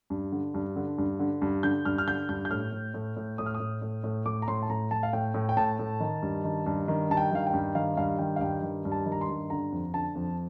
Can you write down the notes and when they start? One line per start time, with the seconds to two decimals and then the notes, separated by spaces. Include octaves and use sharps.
0.10 G2
0.32 D3
0.54 G2
0.76 D3
0.98 G2
1.20 D3
1.42 G2
1.63 D3 G6
1.85 G2 F6
1.98 F6
2.07 D3 G6
2.29 G2 G6
2.45 G6
2.51 A2 F6
2.72 A2
2.94 A2
3.16 A2
3.38 A2 D#6
3.46 F6
3.54 D#6
3.60 A2
3.82 A2
4.04 A2
4.25 A2 D6
4.42 A#5
4.48 A2 C6
4.62 A5
4.69 A2 A#5
4.91 A2 A5
5.03 F5
5.13 A2 G5
5.34 A2
5.49 G5
5.57 A2 A5
5.79 A2
6.00 D#3
6.23 G2
6.44 D#3
6.66 G2
6.88 D#3
7.10 G2 A5
7.17 G5
7.32 D#3 F5
7.47 G5
7.54 G2
7.75 D#3 F5
7.97 G2 F5
8.19 D#3 G5
8.36 F5
8.41 G2 G5
8.62 D#3
8.85 G2
8.92 A5
9.06 D#3
9.12 A#5
9.21 C6
9.28 G2
9.50 D3 A#5
9.72 F2
9.94 D3 A5
10.15 F2